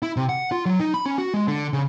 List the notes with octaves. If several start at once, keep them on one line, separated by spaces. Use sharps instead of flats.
E4
C3
F#5
F4
F#3
D#4
B5
C#4
F#4
G#3
D3
C#3